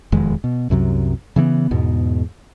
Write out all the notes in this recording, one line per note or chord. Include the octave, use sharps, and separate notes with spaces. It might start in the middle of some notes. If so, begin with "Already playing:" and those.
E1 F2 D#3 G#3
B2
C2 F#2 C3 F#3
C#3 E3 F#3 B3
E2 G#2 B2